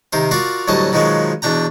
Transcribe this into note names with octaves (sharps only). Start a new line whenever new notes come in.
C3 D#3 A#4 C5
F4 F#4 A#4 D5 F5
D2 A2 F#3 G3 D#5 A5
B2 D#3 F3 F#3 G#3 B3
E2 B2 D4 G5 A#5